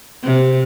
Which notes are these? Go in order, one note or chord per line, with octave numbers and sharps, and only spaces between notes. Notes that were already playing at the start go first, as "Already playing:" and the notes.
C3